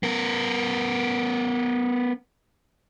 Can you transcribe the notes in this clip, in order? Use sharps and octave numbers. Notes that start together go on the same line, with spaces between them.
B3 A#4